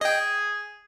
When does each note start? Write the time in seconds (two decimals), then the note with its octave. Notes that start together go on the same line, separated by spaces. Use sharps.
0.01 G#4 D#5 G5